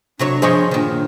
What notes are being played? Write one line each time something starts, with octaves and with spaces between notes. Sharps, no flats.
C3 F#3 D4 C#5
G2 F3 G#4 C5 C#5 D#5
A#2 D#3